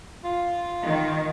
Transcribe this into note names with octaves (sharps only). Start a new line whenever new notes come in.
F4
D#3